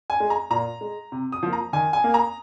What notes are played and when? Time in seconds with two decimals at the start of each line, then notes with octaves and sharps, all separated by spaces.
0.10 G#5
0.20 G#3
0.30 A#5
0.50 A#2 A#5
0.81 G#3
1.12 C3
1.32 D#6
1.43 F3 A#3
1.53 A#5
1.73 D#3 G#5
1.93 G#5
2.04 A#3
2.14 A#5